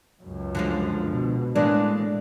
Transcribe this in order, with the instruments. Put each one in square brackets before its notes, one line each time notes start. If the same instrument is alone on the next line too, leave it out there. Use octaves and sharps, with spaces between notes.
[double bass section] C#2 F#2
[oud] D3 F3 G#3
[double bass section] B2
[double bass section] A2 [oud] E3 G#3 A#3 [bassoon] D4